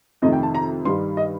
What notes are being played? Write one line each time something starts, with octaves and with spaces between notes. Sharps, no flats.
F2 C3 D#3 A3 D#5
G5
A5
A#5
G2 D#3 G3 C6
D#5